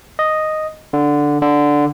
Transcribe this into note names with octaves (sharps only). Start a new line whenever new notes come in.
D#5
D3
D3